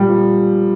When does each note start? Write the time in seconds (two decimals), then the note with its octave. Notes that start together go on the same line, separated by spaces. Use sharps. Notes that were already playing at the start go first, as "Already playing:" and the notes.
Already playing: A#2 G3
0.09 F3